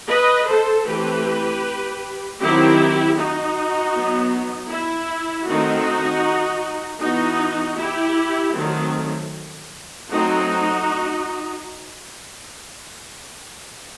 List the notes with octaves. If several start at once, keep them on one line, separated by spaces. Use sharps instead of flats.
B4 D#5
A4 C5
E3 A3 C4 G4 B4
D#3 F#3 C4 E4 G4
D#4 F#4
F#3 B3
E4
D#3 A3 C4 D#4 F#4
E3 B3 D#4 F#4
E4 G4
D#3 F#3 A3 C4
F#3 A3 C4 D#4 F#4